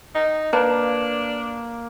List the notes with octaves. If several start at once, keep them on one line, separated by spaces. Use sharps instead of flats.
D#4
A#3 D4 B4 F5 A5